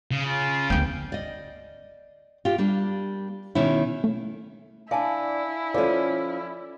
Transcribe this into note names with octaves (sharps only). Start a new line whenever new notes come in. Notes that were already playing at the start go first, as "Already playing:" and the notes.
C#3
F4
D2 B3 G5
D5 D#5
F4 G4
G3 A#3 D4
B2 D#3 C#4 E4
A3
D4 E4 D5 F5 G#5 A5
F3 C#4 A4 D5